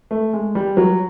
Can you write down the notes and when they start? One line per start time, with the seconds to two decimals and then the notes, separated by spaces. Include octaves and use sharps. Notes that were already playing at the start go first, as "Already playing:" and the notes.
0.11 A3
0.33 G#3
0.55 G3
0.77 F#3